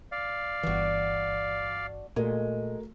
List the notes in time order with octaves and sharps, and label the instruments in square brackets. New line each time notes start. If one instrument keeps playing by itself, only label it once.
[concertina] D5 F5
[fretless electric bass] G1 E3 [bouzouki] D4 F#4
[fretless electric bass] A#2 [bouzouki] G#3 [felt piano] A3 F#4 A#4